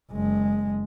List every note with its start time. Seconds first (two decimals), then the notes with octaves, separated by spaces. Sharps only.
0.11 F#1 G#3